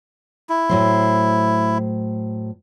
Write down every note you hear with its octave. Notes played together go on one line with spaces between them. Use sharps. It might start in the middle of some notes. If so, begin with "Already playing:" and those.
E4
A2 F#3 C5